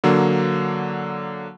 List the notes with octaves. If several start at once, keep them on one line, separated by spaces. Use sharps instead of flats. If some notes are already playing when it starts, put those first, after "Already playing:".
D3 F#3 A#3